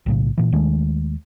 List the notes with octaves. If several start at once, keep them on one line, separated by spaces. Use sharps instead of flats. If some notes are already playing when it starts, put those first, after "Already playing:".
B1 A2 C#3
A#2 E3
D#2 D#3 G#3 A3